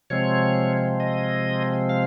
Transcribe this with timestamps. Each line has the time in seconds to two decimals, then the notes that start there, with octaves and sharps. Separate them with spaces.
0.10 C3 F3 G#3 C4 C#5
1.00 D#5
1.89 F5